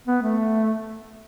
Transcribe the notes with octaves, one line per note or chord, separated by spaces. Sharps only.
B3
A3